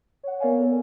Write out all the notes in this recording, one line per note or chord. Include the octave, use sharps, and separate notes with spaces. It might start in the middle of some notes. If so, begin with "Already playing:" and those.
C#5 F#5
B3 A#4 C#5 D5 F5 G#5
A4